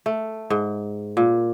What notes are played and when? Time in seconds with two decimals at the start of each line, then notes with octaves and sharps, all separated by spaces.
0.06 A3
0.50 G#2
1.17 A#2